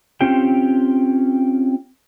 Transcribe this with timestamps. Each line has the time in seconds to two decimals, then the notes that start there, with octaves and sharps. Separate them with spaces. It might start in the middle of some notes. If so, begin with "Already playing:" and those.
0.21 C4 C#4 F4 G4 G5